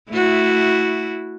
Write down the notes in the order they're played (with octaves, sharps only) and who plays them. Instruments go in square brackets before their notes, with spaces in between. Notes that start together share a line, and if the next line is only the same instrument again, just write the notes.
[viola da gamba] A3 E4 F#4